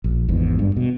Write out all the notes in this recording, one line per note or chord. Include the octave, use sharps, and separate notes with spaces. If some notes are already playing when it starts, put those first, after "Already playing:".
A#1
G#1 E2 G#2
G2
B2